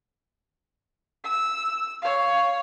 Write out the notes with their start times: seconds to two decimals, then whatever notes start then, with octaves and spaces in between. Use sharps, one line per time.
1.24 E6
2.02 C#5 F5